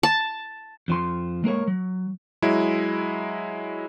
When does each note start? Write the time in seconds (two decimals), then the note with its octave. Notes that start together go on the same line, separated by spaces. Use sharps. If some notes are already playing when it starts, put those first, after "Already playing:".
0.03 A5
0.88 F2 F3 C6
1.44 G#3 A#3 A#4 C#5
1.68 F#3
2.42 F#3 G#3 E4